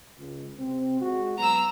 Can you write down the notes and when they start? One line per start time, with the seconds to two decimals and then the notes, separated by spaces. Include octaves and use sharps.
0.18 C#2
0.58 C3 C4
1.01 G#3 F#4
1.38 F#3 B3 A#5 E6